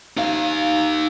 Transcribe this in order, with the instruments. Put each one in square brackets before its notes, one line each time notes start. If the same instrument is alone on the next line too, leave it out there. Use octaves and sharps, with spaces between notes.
[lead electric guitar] D#4 F5